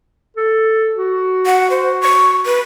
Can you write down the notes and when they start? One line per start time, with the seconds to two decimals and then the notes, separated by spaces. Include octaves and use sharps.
0.37 A4
0.96 F#4
1.46 F#5
1.70 C5
2.02 C#6
2.46 B4